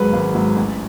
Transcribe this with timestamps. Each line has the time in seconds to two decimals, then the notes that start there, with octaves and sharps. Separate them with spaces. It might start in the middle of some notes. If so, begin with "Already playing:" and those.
Already playing: G#1 G#2 F#3 B4
0.13 G#1
0.35 G#2 F#3
0.56 A1